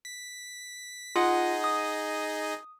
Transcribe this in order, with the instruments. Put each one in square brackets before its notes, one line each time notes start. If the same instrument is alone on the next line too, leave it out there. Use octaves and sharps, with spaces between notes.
[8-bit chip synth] B6
[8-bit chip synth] D#4 G#4 D#5 [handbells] F4 [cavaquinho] F#5
[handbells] D#6